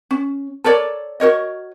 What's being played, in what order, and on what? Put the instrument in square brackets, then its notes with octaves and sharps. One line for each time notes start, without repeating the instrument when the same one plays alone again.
[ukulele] C#4
A4 A#4 C#5 D5
F#4 A#4 C#5 D#5